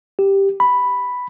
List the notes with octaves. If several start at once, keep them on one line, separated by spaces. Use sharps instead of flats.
G4
B5